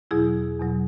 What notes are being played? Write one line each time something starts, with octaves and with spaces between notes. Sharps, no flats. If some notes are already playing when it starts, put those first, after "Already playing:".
E2 B2 F#3 E4 G#4
E2 B2 F#3